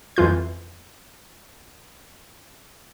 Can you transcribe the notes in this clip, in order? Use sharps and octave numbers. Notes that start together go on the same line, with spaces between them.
F2 E3 F4 G6